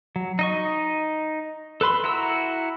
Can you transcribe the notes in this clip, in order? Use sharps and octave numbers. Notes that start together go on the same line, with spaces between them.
F#3
D#4 D#5 C#6
A4 B4 B5 C6
E4 F#4 A#5 E6